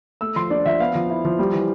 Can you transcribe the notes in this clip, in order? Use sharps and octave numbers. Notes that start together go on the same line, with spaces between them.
A3 E6
F3 C6
D4 D5
F3 E5
B3 F5
F3
E4
F3
G3
E3